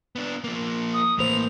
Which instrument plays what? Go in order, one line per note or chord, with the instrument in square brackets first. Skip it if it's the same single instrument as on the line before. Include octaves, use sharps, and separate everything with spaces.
[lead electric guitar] B3 D4
F3 A#3
[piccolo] D#6
[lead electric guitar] A2 E3 [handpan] A#3 C5 [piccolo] F7